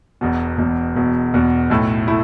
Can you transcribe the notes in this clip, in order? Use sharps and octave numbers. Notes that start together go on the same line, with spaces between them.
E1 E2 B2
E1 E2 B2
E1 E2 B2
E1 E2 B2
B1 A2 A3 E4
A3 E4